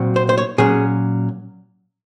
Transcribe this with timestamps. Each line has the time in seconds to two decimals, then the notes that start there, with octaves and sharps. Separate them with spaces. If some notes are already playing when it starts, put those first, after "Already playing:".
Already playing: A#2 F#3 C4
0.16 C5
0.29 C5
0.38 C#5
0.58 A#2 F#3 C#4 G#4